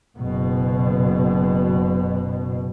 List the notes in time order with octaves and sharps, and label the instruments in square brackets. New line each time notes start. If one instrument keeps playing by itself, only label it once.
[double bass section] F#1 B2